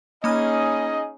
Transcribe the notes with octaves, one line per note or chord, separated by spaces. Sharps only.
A#3 C#4 D#4 G#4 D#5 B5 F6